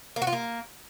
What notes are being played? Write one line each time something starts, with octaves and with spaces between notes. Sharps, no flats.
A#3
F#4
F4
A#3